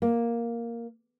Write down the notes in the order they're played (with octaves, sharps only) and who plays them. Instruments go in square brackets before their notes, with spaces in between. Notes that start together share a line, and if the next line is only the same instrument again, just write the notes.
[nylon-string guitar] A#3